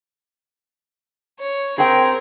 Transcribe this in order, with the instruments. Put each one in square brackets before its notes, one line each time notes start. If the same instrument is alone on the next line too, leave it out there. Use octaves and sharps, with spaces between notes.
[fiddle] C#5
[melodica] C4 [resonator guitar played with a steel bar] G#4 G5 [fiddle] A#4